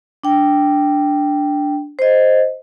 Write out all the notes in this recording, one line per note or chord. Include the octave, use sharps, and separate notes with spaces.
D4 G5
C5 D#5